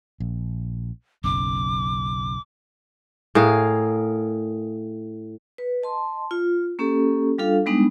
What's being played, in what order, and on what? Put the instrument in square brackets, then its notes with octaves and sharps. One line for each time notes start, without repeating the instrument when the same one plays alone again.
[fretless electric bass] A#1
[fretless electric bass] F#1 B1 F#2 [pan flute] D6
[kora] A2 G#4 A#4 F5
[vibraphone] B4
D#5 A5 C6
F4
A#3 C#4 G4 A4
G3 D4 F4 A4 F5
G3 G#3 B3 D4 D#4 B5